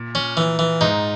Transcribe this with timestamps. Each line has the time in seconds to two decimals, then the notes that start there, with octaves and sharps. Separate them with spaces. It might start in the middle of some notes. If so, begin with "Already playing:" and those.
Already playing: A#2
0.15 C#4
0.37 E3
0.59 E3
0.81 G#2 D#4